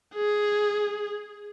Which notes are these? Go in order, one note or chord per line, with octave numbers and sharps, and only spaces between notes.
G#4